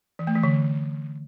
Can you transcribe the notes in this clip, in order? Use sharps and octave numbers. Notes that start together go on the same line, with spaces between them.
E3
A3
E3
D3